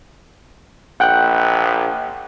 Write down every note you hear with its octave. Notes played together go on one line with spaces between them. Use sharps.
A#1 F#5 G5 F#6